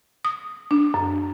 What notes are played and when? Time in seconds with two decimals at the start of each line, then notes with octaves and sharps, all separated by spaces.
0.25 D#6
0.71 D4
0.94 F#2